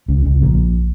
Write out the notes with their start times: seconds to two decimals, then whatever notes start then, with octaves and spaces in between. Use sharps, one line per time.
0.08 C#2 C#3
0.25 C#2 C#3
0.42 A#1 A#2